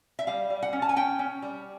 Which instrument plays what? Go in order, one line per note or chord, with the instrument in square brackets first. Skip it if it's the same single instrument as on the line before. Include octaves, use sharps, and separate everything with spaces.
[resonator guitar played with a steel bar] E5
G3 F5
G3
F#5
C#4
A5
G#5
C#4 G5
C#4
G3